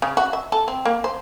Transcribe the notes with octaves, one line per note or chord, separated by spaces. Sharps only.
C#3
F#4
E5
A4
C4
A#3
C5